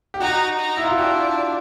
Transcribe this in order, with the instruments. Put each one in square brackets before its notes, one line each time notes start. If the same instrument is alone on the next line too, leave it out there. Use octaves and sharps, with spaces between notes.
[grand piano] G4
[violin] D#4 [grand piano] F#4
[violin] D#4
[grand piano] E4
F4
F#4
[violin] D4 [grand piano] G4